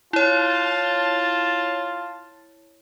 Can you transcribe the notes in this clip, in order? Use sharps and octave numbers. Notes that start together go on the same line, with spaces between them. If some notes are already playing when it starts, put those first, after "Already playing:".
E4 F4 C#5 A5